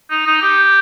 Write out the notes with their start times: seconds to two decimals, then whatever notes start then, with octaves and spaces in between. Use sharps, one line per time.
0.10 D#4
0.26 D#4
0.41 G4